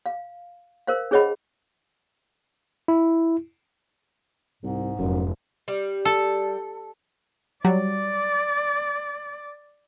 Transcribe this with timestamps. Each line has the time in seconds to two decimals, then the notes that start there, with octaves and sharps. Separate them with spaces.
0.06 F5
0.87 A#4 C5 F5
1.11 D4 G#4 C#5 D#5 F#5 B5
2.88 E4
4.63 C2 G#2
4.99 F1 F#2
5.68 G3
6.05 A4
7.65 F#3 G3 D5